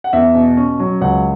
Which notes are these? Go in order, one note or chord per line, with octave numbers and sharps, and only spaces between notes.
F#5
E2 E5
B2
C#4
F#3
C#2 F#5